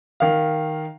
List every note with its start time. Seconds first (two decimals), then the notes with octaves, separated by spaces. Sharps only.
0.20 D#3 F5